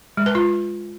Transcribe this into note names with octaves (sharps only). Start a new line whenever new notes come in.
G#3
B4
F4